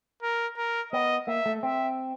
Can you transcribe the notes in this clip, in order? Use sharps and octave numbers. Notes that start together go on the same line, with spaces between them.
A#4
A#4
B3 D#5
A#3 E5
A3
C4 E5